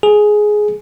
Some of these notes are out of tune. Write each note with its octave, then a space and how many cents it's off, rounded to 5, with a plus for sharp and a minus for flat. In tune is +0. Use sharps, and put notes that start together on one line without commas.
G#4 +10